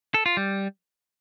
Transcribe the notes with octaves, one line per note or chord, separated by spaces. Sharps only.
A4
F4
G3